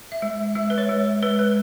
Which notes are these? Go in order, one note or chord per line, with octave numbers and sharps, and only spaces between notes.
E5
G#3
G#3 E5
B4
C#5
G#3
G#3 B4
B4